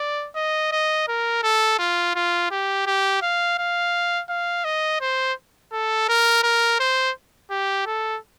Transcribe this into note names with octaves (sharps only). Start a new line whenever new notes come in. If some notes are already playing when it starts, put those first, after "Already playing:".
Already playing: D5
D#5
D#5
A#4
A4
F4
F4
G4
G4
F5
F5
F5
D#5
C5
A4
A#4
A#4
C5
G4
A4